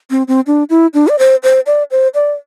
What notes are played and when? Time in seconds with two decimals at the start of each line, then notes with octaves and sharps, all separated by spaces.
0.11 C4
0.28 C4
0.47 D4
0.70 E4
0.94 D4
1.08 D5
1.19 C5
1.43 C5
1.66 D5
1.91 C5
2.15 D5